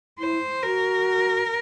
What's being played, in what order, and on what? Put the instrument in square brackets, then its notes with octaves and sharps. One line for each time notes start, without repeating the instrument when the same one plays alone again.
[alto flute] E4 [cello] C5
[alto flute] F#4 [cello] A#4